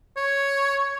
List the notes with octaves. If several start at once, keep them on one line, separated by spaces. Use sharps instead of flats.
C#5